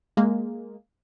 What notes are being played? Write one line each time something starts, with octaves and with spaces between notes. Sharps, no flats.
G#3 A#3